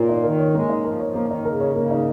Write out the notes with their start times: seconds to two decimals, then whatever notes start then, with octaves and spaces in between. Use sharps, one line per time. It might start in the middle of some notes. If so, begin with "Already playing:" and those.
Already playing: A#2 A#3 A#4 C#5
0.09 D#4
0.24 D#3 A#4
0.39 C#5
0.54 G#3 A#3
0.69 D#4
0.84 F3 A#4
1.00 C#5
1.05 F3
1.15 A#3
1.25 D#3
1.31 D#4
1.45 C#3 A#4
1.60 C#5
1.76 C#3 A#3
1.91 D#4